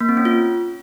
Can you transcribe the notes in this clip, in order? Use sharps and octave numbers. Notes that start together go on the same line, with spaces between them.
A#3
C4
C#4
F4